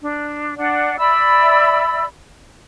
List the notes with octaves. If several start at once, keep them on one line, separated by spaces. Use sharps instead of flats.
D4
D4 D5 F#5
D5 E5 B5 E6